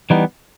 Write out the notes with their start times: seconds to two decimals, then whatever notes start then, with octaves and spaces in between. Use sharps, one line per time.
0.10 E3 G3 B3 D#4